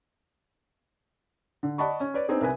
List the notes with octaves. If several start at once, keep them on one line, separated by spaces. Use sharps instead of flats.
D3
D5 D#5 F#5 A5 B5 C#6
C#4
B4 C#5 D5
B3 C4 D4 D#4 G#4
C2 A#4 B4 G#5